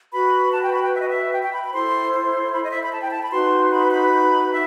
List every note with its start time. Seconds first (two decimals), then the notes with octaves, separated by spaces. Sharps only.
0.12 F#4 B4 B5
0.52 A5
0.62 G5
0.72 B5
0.82 G5
0.92 E5
1.00 D#5
1.07 E5
1.32 G5
1.42 G5
1.51 B5
1.61 B5
1.72 E4 A4 C5 C6
2.11 C6
2.51 B5
2.61 D#5
2.71 E5
2.81 B5
2.91 A5
3.01 G5
3.11 A5
3.21 B5
3.31 D#4 F#4 B4 C6
3.71 B5
3.90 B5
4.51 E5